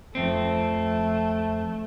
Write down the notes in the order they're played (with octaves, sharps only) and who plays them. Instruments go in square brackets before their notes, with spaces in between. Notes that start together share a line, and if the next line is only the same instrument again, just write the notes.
[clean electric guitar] F2 C4 [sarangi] A3